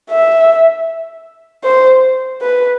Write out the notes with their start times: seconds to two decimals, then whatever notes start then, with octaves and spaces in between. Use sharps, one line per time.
0.10 E5
1.64 C5
2.42 B4